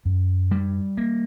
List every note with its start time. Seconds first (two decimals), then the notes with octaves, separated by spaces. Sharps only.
0.05 F#2
0.51 G3
0.97 A#3